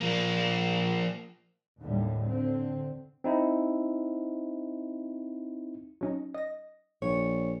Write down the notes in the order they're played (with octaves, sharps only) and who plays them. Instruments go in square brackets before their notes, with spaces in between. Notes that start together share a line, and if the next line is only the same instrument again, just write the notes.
[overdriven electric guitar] F3 A#3
[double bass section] D#2 A2 D3 G3
D3 C4
[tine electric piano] C4 D#4 E4
[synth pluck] F#3 C#4 D#4
D#5 A#6
[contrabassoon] A#1 [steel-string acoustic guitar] C#5